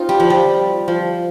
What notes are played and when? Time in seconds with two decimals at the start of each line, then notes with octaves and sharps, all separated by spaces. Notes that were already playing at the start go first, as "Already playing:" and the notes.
Already playing: C4 D#4 F4
0.09 G3
0.20 F3
0.30 G3
0.88 F3